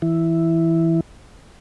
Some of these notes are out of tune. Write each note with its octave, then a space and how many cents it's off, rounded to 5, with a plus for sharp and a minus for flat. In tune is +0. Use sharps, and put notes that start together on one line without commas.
E3 +0 E4 +0